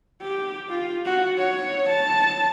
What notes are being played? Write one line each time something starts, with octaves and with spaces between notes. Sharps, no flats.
G4
F4
F#4
C#5
A5